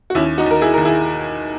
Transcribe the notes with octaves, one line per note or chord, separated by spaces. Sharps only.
F#4
D#2 C#4 E4
D#4 F#4
D#2 A#4
E4 G#4
D#2 A#4
E4 G#4